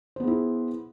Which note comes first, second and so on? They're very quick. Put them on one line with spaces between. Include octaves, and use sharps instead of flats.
C5 B3 G#4 E4